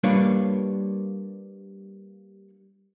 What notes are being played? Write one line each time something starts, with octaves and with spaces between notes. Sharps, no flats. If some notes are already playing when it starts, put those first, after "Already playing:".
G3 A#3 D4 F4 B4 C#5